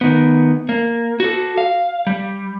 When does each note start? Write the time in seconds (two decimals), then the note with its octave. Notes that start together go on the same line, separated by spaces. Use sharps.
0.01 D#3 B3
0.69 A#3
1.20 F#4 A4
1.58 F5
2.07 G3